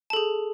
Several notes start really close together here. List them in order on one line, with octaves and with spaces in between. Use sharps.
A5 A4 G#4